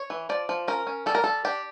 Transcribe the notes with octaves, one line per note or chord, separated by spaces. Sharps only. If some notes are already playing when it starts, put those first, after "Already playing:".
Already playing: C#5
E3
F3 D5
F3
C#4 A#4
C#4
G3 A4
A#4
G3 A4
D4 G4